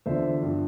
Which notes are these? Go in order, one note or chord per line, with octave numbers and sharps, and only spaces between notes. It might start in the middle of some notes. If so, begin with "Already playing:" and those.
E2 D3 F3 C5 E5
G2 F3